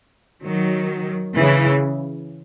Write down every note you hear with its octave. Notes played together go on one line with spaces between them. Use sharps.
D#3 F#3
C#3 E3